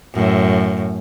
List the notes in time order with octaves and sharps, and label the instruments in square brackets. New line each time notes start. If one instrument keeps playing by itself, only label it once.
[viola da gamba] F#2 A2